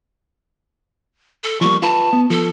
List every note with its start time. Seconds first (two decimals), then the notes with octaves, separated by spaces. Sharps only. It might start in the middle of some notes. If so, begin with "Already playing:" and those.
1.44 A4
1.61 F3 G3 A#3 C#6
1.82 F4 B4 A5
2.13 B3
2.30 F3 A4